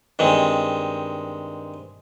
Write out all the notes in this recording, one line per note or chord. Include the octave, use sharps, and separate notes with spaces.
G2 D#3 G#3 C4